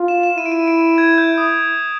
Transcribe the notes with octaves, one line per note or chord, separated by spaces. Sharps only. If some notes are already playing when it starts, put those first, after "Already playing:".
Already playing: F4
E7
E7
E4 D#7
D7
D#7
D7
G#6
G6
D#6